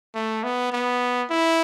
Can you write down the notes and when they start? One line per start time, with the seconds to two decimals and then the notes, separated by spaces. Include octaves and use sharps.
0.15 A3
0.43 B3
0.72 B3
1.30 E4